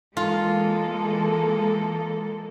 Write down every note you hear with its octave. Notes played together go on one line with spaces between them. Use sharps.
E3 G#3 A#3 F4 A4